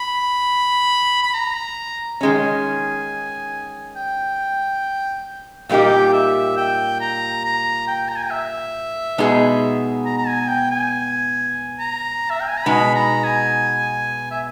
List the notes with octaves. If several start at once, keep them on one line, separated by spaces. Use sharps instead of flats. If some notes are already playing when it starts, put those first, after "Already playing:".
Already playing: B5
B5
A#5
D#3 G#3 C#4 G#5
G5
A#2 G3 A#3 D#4 G4 G5
E5
G5
A#5
A#5
G5
A#5
G#5
G5
E5
B2 G#3 B3 D#4 G#4
A#5
A#5
G#5
G5
G#5
A#5
E5
G5
G#5
A#5
B2 G#3 B3 D#4 B5
A#5
G#5
E5